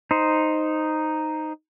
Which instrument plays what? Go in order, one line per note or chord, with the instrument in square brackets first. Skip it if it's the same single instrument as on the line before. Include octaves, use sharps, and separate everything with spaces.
[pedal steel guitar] D#4 C5